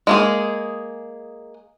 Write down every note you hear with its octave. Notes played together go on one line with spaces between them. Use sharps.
G#3 A#3 G#4